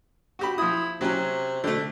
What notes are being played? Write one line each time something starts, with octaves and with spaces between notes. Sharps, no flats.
F#4 G4 B5
F3 E4 D#6
C3 F#3 C#4
D3 A3